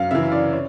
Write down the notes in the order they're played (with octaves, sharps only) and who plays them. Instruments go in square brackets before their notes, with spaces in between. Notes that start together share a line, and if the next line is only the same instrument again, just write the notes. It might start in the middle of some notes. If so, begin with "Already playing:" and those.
Already playing: [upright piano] F#2 F5
C#3 E3 E5
D5
C#5